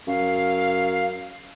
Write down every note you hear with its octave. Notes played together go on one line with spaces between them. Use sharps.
F#2 F5